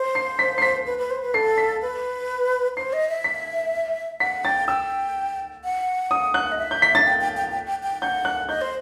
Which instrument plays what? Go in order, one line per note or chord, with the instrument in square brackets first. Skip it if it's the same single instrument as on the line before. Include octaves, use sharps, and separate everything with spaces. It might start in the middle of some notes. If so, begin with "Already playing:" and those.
Already playing: [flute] C5
[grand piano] C7
B6
C7
B6
[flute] B4
B4
C5
B4
[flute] A4 [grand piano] C7
[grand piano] B6
[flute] B4
[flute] C5 [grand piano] C7
[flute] D#5
E5
[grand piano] B6
[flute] F#5 [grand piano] B6
[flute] G5 [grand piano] A6
[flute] G5 [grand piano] E6
[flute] F#5
[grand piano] D#6
F#6
[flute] D#5
E5
[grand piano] G6
B6
A6
[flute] G5
G5
G5
G5
G5
G5
[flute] F#5 [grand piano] G6
[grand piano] F#6
[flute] D#5 [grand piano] G6
[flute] C5